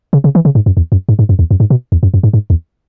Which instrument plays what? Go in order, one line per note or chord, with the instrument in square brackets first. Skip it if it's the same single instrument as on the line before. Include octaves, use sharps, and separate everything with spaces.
[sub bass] C#3
C#3
E3
C#3
G#2
F#2
E2
F#2
G#2
G#2
F#2
E2
F#2
G#2
B2
E2
F#2
F#2
G#2
G#2
E2